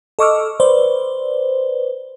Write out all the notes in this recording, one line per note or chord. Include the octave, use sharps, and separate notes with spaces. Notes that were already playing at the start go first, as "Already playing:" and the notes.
A4 D#5 C#6 D6 E6 F6
B4 C5 D5